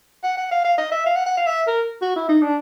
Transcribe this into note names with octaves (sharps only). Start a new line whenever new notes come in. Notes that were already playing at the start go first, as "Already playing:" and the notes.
F#5
F#5
F5
F5
D#5
E5
F5
F#5
F#5
F5
E5
A#4
F#4
E4
D#4
D4